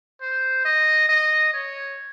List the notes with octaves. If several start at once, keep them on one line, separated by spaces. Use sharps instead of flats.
C5
D#5
D#5
C#5